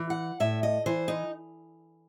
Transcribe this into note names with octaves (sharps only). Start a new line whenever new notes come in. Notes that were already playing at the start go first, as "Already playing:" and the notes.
Already playing: E3
F#5
A2 E5
D#5
E3 C5
D#4